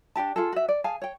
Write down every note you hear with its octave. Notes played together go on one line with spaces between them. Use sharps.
D4 D#4 G4 A5
F4 G#4 A4
F#4 E5
D5
G#4 F5 G#5 A5
C#5 G5